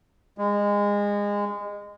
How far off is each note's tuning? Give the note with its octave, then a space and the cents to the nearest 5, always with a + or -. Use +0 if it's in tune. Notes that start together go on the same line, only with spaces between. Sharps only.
G#3 -25